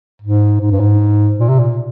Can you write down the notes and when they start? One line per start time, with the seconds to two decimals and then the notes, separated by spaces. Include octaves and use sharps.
0.22 G#2
0.61 G#2
0.71 G2
0.80 G#2
1.40 A#2
1.49 C3
1.59 A#2